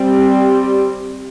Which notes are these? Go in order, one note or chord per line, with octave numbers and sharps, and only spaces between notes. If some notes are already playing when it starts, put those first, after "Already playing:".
Already playing: G3 C4